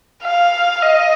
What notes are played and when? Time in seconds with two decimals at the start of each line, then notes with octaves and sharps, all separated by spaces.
0.23 F5
0.82 D#5